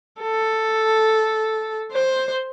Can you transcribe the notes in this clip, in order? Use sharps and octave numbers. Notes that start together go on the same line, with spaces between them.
A4
C5